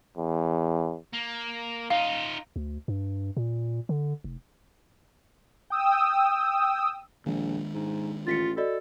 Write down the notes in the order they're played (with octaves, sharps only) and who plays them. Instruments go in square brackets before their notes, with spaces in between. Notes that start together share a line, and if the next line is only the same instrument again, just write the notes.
[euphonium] E2
[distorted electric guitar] A#3
[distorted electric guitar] D#4 F4 [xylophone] F5
[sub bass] D2
G2
A#2
D3
F1
[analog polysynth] G5 D#6 E6
[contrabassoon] A#1 [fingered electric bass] D#3 G#3 D4
[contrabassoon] G#2
[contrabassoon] A1 [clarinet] F4 [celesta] A6 B6 C#7
[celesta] F#4 D5 D#5 [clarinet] A4